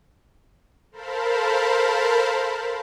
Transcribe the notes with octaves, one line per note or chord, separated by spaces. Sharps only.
A4 A#4 C5 F5 A5 B5